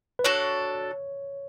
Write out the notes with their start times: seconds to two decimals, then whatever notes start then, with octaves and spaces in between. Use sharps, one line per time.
0.19 B4
0.24 D4 F#4 A4 C#5